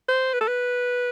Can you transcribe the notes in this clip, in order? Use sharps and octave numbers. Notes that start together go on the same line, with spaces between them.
C5
B4
A4
B4